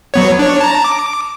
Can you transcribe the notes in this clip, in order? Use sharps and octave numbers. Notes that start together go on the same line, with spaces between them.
F#3 B3 C#5
D4 C#5
A5 A#5
D6